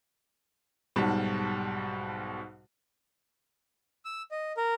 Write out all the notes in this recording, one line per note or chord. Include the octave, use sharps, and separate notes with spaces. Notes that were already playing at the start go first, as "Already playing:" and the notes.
B1 G#2 B2 G3 A5
E6
D#5
A#4